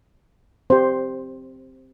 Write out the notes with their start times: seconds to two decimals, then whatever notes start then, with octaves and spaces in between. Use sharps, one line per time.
0.70 C4 G4 C5